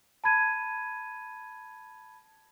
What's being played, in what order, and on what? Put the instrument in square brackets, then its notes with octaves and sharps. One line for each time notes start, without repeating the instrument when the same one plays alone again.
[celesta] A5 B5 G#6 D#7